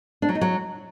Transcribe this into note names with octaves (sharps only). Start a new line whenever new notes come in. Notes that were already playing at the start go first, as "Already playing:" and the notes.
D4
F#3
D#4
F#3